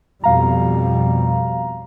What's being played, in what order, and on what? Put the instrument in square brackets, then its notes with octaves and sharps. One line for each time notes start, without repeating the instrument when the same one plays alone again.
[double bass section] F2 B2 G3 [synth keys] F5 A#5